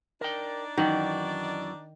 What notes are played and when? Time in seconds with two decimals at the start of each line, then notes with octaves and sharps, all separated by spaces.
0.21 D4 D#4 A#4 D5 G5
0.77 F#2 D#3 E3 F#4